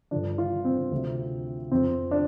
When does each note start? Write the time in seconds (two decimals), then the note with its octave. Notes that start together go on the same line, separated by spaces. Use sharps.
0.11 G2 D3 F3 D4
0.38 F4
0.65 C4
0.92 D2 C3 F3
1.72 F2 F3 C4
2.11 D4